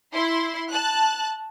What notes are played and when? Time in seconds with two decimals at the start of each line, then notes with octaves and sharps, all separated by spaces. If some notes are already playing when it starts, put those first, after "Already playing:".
0.13 E4 C6
0.71 A5 F#6